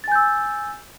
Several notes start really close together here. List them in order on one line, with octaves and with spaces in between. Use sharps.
A6 G#5 G6 E6